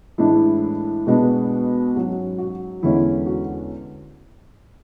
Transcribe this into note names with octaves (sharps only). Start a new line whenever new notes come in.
A2 E3 G#3 D4 E4
B2 G#3 B3 D4
G#2 F#3 C#4 F#4
F#4
E2 D3 G#3 C#4 E4
F#4